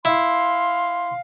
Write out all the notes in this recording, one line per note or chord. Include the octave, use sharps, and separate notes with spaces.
E4 F5 C6